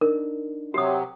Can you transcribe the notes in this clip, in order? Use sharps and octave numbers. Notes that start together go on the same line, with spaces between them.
D4 D#4 A#4
C3 F#3 G4 D#6